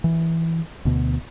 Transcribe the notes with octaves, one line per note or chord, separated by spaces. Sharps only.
E3
D2 B2